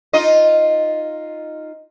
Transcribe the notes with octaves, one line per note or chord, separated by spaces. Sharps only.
D#4 F4 D#5